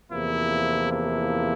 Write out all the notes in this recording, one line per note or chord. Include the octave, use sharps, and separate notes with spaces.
E2 C3 F3 A#3 E4
E4